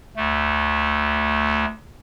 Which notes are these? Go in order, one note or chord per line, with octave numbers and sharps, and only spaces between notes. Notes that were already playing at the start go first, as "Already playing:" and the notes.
D2 A3